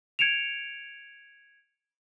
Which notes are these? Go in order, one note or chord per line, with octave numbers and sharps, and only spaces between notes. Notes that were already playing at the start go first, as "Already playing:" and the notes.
G#6 C#7 D7 E7 F7